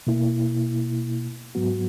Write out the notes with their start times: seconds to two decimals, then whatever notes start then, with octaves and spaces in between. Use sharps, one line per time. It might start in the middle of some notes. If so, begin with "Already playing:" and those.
0.07 B2 A#3 E4
1.55 G#2 F#3 B3 F#4